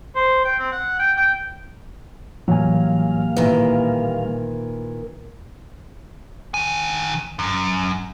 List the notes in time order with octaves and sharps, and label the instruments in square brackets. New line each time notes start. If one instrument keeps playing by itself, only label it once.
[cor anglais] C5
G5
C4
F#5
G5
G5
[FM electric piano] A2 E3 G#5 [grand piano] F#3 [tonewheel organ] G3 A#3 F5
[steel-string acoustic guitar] A#2 D#3 [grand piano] B3 E4
[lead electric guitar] D#3 G#5
F#2